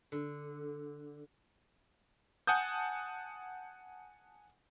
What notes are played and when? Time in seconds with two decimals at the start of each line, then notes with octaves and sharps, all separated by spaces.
0.12 D3
2.47 F#5 G#5 A5 D#6 G6